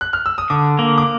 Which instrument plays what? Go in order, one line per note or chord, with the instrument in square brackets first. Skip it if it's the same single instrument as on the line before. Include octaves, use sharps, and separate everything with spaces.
[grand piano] F#6
F6
E6
D#6
[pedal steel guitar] D3 [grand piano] D6
[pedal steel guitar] A#3
[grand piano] D6